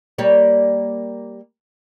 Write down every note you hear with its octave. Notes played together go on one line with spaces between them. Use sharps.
G3 A#3 C#5